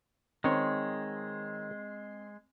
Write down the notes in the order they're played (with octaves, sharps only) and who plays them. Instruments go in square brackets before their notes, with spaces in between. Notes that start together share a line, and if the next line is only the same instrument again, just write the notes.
[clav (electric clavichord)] D#3 C#5 [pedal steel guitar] G#3 C6 [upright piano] C4